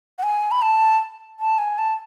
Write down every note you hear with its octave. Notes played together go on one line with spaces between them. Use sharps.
F#5
G#5
B5
A5
A5
G#5
A5